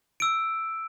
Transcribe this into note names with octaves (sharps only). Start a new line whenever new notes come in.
E6 D7